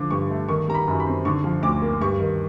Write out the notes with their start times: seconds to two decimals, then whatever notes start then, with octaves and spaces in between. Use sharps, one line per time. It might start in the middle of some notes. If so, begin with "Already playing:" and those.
Already playing: D3 F3 D6
0.11 G2 C#6
0.30 A3
0.48 D#3 C#6
0.68 G3 A#5
0.74 B5
0.87 F#2
1.00 B5
1.06 C4
1.25 D3 C#6
1.44 F3
1.63 D2 D6
1.82 A#3
2.01 G2 C#6
2.20 D#3